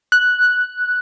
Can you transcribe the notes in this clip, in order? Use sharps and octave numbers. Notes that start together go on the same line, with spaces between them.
F#6